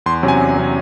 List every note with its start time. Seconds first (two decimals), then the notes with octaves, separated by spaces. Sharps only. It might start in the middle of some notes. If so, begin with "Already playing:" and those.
0.06 E2 C6
0.23 C3 F#3 C#4
0.28 G#5
0.40 E2
0.57 C3 F#3 C#4